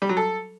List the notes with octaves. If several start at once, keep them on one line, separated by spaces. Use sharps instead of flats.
G3
F#3
A4